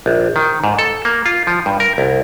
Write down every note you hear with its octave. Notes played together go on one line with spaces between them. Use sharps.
A#1
D#3
G#2
A4
A#3
F4
F3
G2
A#4
C2